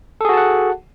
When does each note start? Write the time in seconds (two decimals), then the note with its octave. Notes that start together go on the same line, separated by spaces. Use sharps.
0.21 A4
0.25 G#4
0.29 F#4
0.33 A5
0.37 F#5